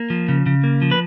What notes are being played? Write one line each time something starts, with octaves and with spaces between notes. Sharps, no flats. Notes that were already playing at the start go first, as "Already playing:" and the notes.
Already playing: A#3
F3
C#3
C#3
A#3
F3
B4